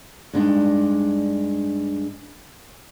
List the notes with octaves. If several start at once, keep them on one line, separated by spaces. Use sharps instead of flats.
G2 G#3 D4 D#4